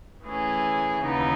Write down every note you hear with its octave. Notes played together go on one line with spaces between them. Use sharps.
E3 A3 C#4 G#4
D#2 C#3 E3 B3 D#4